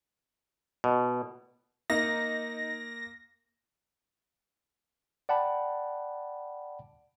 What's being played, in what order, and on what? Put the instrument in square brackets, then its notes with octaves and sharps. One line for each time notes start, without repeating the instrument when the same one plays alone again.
[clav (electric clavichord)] B2
[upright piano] A#3 [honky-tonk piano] D#4 [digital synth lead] A#6
[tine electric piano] D5 F#5 G5 A5 B5